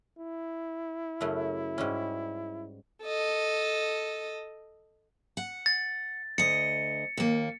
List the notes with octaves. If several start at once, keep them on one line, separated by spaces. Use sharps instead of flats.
E4
F#2 C#3 A3
G#2 G3 C#4
A4 D#5
F#5
A6
D2 D#5 C#7
D#2 A#3